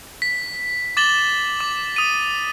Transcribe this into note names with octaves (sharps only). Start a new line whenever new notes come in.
B6
D6 A6 E7 F#7 G7
D6
D#6 D#7